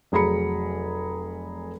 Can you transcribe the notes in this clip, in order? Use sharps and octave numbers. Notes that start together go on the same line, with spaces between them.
F1 F#3 G#4 A#5 B5 C#7